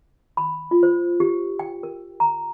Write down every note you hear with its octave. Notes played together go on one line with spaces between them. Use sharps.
B5
F4
C5
G4
G5
A#4
A#5